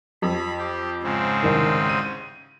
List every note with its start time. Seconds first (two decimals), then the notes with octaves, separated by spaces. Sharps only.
0.22 F2 B5
0.58 G4
1.03 G#2 C#3 C4
1.43 C2 D#3
1.89 D#7